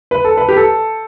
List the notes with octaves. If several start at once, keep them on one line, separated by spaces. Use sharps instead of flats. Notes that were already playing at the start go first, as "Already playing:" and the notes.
B4
A4
B4
G4
A4